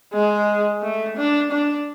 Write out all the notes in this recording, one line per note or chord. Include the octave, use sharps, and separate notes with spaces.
G#3
A3
D4
D4